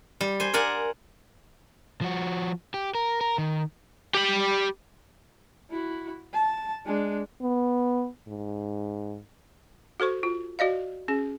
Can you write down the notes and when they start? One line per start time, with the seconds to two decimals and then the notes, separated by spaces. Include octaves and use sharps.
0.21 G3
0.40 C5 G#5
0.54 A#4 D5 F#5 G#5
2.01 F3 F#4
2.74 G4
2.95 A#4
3.21 A#4
3.38 D#3
4.15 G4 B5
5.70 E4 F#4
6.33 A5
6.85 G#3 D4
7.41 B3
8.28 G#2
10.00 F#4 A4 C5 C#6
10.23 F4
10.59 F#4 D5 D#5 F5
11.08 C#4 G#4